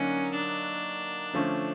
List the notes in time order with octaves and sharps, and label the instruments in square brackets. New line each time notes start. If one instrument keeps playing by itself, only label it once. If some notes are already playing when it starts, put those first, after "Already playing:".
Already playing: [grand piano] D3 F#3 A#3 D#4 [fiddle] C#4
[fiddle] D4
[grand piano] D3 F3 A3 C#4